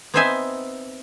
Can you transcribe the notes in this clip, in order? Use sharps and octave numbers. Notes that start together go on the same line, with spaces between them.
B3 C4 D#4 C5 E5 G#5